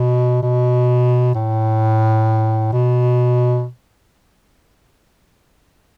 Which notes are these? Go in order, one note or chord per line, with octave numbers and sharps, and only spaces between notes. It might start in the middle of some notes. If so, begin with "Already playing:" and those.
Already playing: B2
B2
A2
B2